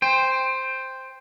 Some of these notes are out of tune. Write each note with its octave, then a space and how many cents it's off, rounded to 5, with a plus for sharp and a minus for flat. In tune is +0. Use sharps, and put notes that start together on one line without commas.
C5 +0 G5 +20